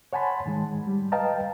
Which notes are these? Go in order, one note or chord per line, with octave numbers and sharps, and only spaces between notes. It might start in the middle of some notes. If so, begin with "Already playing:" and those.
C#5 F#5 G#5 A5 B5 C6
G#2 D#3 G#3
G3
B4 D#5 F5 G5 A5 A#5